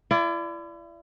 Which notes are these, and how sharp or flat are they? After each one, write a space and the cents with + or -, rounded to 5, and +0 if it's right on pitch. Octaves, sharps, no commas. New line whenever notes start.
E4 +40 D5 -5